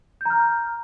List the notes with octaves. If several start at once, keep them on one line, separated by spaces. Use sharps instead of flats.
A#5 F6 G6